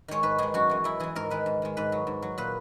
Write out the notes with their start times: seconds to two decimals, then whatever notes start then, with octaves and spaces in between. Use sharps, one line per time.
0.08 D#3 G#3 C#5
0.23 G#2 B4
0.38 D#3 G#3 G#4
0.54 F#2 F#4
0.70 E3 G#3
0.84 F#2 E4
1.00 E3 G#3 G#4
1.15 G#2 A#4
1.30 D#3 G#3 B4
1.46 G#2
1.62 D#3 G#3
1.77 G#2 B4
1.92 F#3
2.07 G#2
2.22 F#3
2.38 A#2 B4